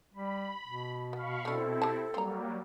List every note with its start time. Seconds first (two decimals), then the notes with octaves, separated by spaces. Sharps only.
0.14 G3 B5
0.65 B2
1.13 B3 F5 B5 C#6
1.45 A3 C4 D4 E4 A4
1.82 G4 A5
2.14 F#3 G3 A#3 C4 A#5